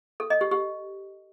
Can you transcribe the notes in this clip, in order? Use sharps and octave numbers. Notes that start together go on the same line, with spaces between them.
A4
D#5
G4
G4